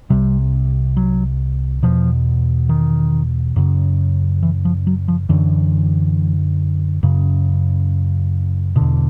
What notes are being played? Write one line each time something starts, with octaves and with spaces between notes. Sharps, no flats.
C2 C3 G3
F#3
E2 B2 F3
D#3
F#2 C#3
E3
F3
F#3
F3
F#2 D3 E3
F#2 C#3
E2 B2 D3